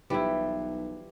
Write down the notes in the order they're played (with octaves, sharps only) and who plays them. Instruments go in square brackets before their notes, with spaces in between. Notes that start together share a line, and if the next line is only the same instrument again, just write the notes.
[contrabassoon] B1 [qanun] E3 F3 [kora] G3 E4